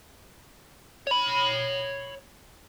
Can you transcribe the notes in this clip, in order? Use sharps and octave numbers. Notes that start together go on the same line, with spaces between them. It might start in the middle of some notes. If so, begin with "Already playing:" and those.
C#5 B5